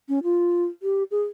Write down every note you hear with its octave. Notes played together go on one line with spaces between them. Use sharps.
C#4
F4
G4
G#4